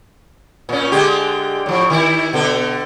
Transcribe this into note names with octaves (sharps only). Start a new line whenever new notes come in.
A#2 C#4
D3 G#3 G4
A2 F3
D#3 E4
B2 D3 A4